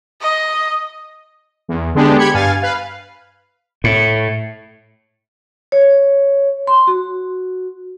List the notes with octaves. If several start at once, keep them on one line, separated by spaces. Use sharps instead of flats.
D#5
E2
D3 G#3 B3 D4 G4
G4 B5 G#6 C#7
G2 F5 G#5 A6
B4 F5
A2
C#5
C6
F#4